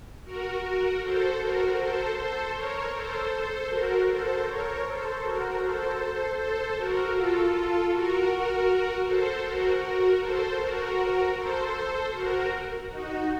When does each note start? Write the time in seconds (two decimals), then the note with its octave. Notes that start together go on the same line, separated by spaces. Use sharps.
0.24 F#4 A#4
0.62 F#4 A#4
1.01 A4 C5
1.39 F#4 A#4
1.77 A4 C5
2.16 A4 C5
2.54 A#4 C#5
2.92 A4 C5
3.31 A4 C5
3.69 F#4 A#4
4.07 A4 C5
4.46 A#4 C#5
4.84 A4 C5
5.22 F#4 A#4
5.60 A4 C5
6.37 A4 C5
6.76 F#4 A#4
7.14 F4 A4
7.90 F#4 A#4
9.05 A4 C5
9.43 F#4 A#4
9.82 F#4 A#4
10.20 A4 C5
10.59 F#4 A#4
11.35 A4 C5
12.12 F#4 A#4
12.89 D#4 F#4